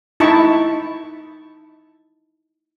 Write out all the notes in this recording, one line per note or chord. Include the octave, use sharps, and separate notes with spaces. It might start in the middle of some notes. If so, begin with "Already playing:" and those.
D#4 E4 A5 B5 C#6